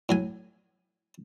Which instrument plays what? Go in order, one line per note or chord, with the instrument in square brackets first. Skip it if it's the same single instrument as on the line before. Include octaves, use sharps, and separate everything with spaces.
[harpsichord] A2 F#3 G#5